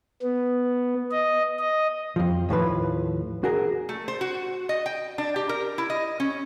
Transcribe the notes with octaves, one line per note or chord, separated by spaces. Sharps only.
B3
D#5
D#5
F2 F3
D#2 A2 F3 B4
F#4 G#4 A#4
A3
C5
F#4
D#5
G5
D4
G4
A#4
E4
D#5
C#4